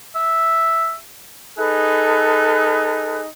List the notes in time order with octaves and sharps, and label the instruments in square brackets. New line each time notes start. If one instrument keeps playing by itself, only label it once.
[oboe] E5
[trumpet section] D#4 G#4 [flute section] A4 B4 F#6